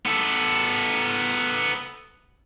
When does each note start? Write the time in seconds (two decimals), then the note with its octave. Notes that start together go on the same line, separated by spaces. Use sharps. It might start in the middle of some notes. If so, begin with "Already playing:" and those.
0.06 B3 A4